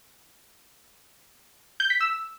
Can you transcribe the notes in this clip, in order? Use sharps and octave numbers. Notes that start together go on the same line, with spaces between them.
G6
B6
E6